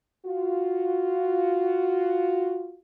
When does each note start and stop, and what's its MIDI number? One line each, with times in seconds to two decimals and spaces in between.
0.26 2.79 65
0.26 2.79 66